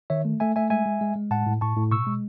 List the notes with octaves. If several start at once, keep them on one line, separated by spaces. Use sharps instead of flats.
D#3 C#5 E5
A3
A3 E5 G#5
A3 E5 G#5
G#3 E5 G#5
G#3
G#3
G#3
A2 F#5 A5
A2
A2 A5 C#6
A2
B2 C#6 E6
G#3